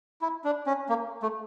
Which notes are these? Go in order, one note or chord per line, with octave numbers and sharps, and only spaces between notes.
E4
D4
C#4
A#3
A3